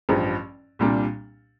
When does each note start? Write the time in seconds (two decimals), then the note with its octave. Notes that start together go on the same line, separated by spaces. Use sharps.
0.09 A1 G2 F3
0.79 C2 A#2 G3 D4